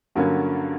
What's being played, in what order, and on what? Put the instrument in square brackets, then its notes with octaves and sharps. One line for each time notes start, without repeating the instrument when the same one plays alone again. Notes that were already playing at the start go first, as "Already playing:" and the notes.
[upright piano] G2 D3 F#3 A#3 C#4